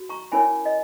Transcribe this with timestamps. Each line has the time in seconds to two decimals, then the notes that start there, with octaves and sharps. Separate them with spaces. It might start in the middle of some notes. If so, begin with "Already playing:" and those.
Already playing: F#4
0.09 A#5 C#6
0.32 C#4 E4 A#4 C#5 G#5 B5
0.66 D#5